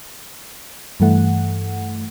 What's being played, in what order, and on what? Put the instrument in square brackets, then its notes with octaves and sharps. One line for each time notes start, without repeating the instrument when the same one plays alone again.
[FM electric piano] G2 E3 A3 F#5